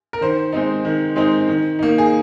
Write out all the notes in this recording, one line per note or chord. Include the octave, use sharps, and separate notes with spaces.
A#4
D#3 C5
G#3 C4 D#4
D#3
G#3 C4 D#4
D#3
A#3 D#4
G#4